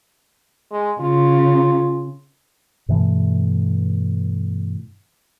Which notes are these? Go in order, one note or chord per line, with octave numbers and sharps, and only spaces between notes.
G#3
C#3 F4
G2 B2 E3 A3